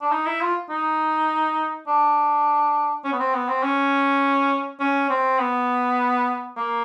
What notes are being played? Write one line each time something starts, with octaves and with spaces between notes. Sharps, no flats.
D4
D#4
E4
F4
D#4
D4
C#4
B3
C4
B3
C4
C#4
C#4
C4
B3
A#3